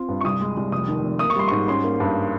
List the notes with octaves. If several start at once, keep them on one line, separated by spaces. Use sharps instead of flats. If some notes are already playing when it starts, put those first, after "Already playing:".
Already playing: C4 F4
G2
C#6
C2 D#6
G#3
C2
F1 D#6
D#3
F1
A#3 D#6
C#6
G3 C6
G#2 C#6
C#4 C6
A#3
G2